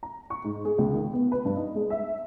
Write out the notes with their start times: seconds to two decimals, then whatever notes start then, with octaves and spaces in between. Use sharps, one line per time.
0.03 A#5
0.30 C#6
0.44 G#2
0.65 G#4
0.78 C#2
0.94 D#3
1.13 B3
1.32 B4
1.45 G2
1.56 D#4
1.75 G#3
1.90 E5